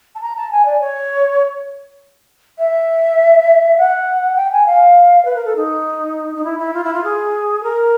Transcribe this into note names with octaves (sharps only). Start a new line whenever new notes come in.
A5
A#5
A5
G#5
D5
C#5
E5
F#5
G5
G#5
F5
B4
A#4
A4
D#4
D#4
E4
E4
F4
E4
F4
G#4
A#4